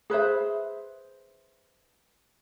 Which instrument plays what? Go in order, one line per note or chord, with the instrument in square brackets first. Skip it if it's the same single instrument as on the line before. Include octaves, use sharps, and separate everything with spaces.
[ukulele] G#4 B4 C5 E5